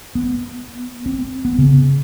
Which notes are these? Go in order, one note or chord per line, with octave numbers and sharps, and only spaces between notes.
B3
C4
B3
C#3